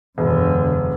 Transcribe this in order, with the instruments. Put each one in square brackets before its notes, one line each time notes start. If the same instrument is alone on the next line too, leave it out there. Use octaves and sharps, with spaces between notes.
[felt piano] E1 [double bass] F#2 D3